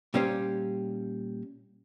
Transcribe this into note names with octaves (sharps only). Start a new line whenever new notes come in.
A#2 G3 C#4 G4 C5